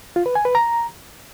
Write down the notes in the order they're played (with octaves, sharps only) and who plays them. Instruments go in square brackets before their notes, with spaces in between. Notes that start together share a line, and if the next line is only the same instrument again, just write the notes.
[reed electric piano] F4
B4
G#5
B4
A#5